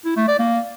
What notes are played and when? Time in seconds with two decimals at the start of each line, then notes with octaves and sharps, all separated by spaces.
0.05 E4
0.16 A3
0.28 D5
0.39 A#3